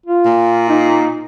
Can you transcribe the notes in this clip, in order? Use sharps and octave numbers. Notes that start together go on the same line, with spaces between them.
F4
A#2
D#4